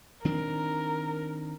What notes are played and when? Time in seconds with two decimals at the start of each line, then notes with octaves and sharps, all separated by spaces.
0.25 D#3 C4 D4 A#4